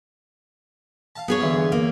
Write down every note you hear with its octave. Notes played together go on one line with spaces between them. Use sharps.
F5 A5
B3 G#4 C#5
G2 D3 E3
A#3